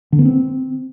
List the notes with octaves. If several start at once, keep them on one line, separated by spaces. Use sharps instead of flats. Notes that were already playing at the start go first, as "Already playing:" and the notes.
D3
B3
C4